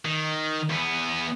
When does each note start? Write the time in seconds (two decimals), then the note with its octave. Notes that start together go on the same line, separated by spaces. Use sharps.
0.05 D#3
0.70 E2 B3